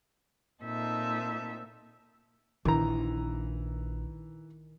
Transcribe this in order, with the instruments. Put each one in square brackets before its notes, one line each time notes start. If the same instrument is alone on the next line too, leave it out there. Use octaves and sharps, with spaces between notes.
[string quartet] A#2 C4 D#4 A4 E5
[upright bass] A#1 [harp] D#3 [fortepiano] E3 A#5